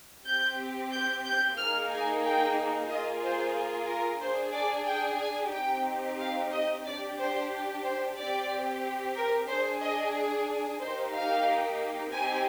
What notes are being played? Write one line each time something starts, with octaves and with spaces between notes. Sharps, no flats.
C4 G4 G6
G6
G6
A#3 D#4 G#4 F6
G#5
G5
A#3 F4 G#4 D#5
C5
A#4
D4 G#4 C5
D5
G5
G#5
C4 D#4 G4 G5
F5
D#5
D4 G4 D5
C5
C5
C4 G4 D5
A#4
D4 G#4 C5
D#5
A#3 D#4 G4 C5
F5
C4 D#4 G4 G#5